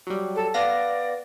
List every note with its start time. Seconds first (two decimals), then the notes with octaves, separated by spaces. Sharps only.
0.07 F#3 G3
0.35 A4
0.54 B3 D5 F5 A#6